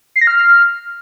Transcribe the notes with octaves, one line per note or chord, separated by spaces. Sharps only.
C7
A#6
F6